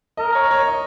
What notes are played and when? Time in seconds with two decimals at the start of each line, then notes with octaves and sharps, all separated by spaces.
0.17 A#4 D#5
0.35 C#5
0.51 C#5
0.68 D#5